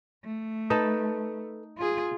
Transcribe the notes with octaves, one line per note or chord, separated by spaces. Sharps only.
A3
D#4 A4 B4 A5
F4 G#4